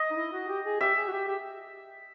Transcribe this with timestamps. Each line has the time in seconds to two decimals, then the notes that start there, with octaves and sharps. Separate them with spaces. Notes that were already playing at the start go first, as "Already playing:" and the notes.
Already playing: D#5
0.11 D#4
0.16 E4
0.33 F#4
0.49 G4
0.65 G#4
0.80 G4 E5
0.97 G#4
1.08 F#4
1.13 G4
1.28 G4